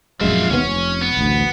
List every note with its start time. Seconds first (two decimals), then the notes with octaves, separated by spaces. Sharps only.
0.21 A#1 F#2 G#3 F4 E5
0.50 D#2 C3 B3 C#4
0.65 F1
1.01 B3
1.17 A1 D2